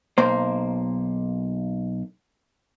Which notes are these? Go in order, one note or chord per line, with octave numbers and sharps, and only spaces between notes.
B1 A#3 C5